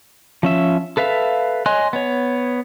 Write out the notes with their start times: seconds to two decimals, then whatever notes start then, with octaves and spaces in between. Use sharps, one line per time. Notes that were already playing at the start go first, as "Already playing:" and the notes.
0.43 F3 C#4 E5
0.97 A4 B4 E5 F5
1.66 C#5 D#5 G#5 C6 F#6
1.93 B3 C#5